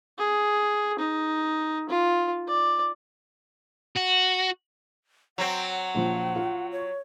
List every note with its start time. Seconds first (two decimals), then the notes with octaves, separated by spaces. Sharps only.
0.18 G#4
0.99 D#4
1.89 F4
2.47 D5
3.97 F#4
5.38 F#3 C4 F#5
5.95 A#1 F3
6.36 F4
6.71 C#5